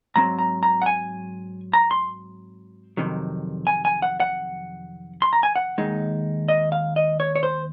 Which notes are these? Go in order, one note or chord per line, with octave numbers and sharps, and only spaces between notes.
G#2 F#3 C4 A#5
A#5
A#5
F#5
G#5
A#5
C6
F2 C3 D#3 F#3
G#5
G#5
F#5
F#5
C6
A#5
G#5
F#5
D#2 D#3 G#3 D#4
D#5
F5
D#5
C#5
C#5
C5